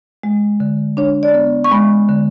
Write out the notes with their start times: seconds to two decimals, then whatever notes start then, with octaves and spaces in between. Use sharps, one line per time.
0.23 G#3
0.60 D3
0.97 D4 C#5
1.23 D5
1.34 B3
1.64 C#6
1.71 G#3 B5
2.09 D3